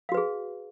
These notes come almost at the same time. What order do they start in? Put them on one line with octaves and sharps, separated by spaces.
F5 F#4 B4 G#4